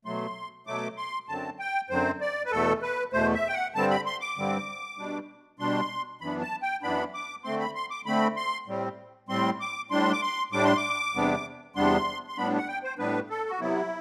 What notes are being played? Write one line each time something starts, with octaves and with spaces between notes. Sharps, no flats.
B2 F#3 A3 C6
B2 F#3 A3 D6
C6
F#2 D3 F#3 C4 A5
G5
F#2 D3 F#3 C4 C5
D5
B4
E2 B2 A3 A4
B4
E2 B2 A3 C5
E5
G5
F#5
G2 D3 G3 C4 A5
B5
C6
D6
G2 D3 G3 C4
B2 G3 D4
B2 G3 D4 C6
F#2 E3 B3 D4 B5
A5
G5
F#2 E3 B3 D4 B5
D6
D3 A3 C4 C6
B5
C6
D6
D3 A3 C4 B5
C6
A2 G3 C4
A2 G3 C4 C6
D6
A2 G3 D4 C6
D6
C6
A2 G3 D4 D6
C6
D6
E2 C3 G3 B3 D4
E2 C3 G3 B3 D4 C6
C6
A2 G3 B3 D4 B5
F#5
G5
C5
A2 G3 B3 D4 B4
A4
F#4
C3 F#3 B3 E4